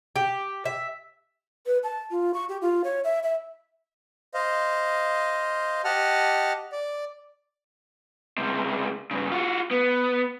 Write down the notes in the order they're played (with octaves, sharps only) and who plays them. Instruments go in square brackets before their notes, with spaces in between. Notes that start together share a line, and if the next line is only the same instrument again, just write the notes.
[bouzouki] G4
E5
[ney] B4
A5
F4
C#6
G4
F4
C#5
E5
E5
[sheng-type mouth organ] C5 D#5 F5
G4 D#5 F#5 A5 F6
D5
[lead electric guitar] C#2 C3
G2 C#3
F4 F#4
B3